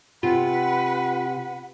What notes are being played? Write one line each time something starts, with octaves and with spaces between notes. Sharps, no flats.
C3 F4 B4 F#5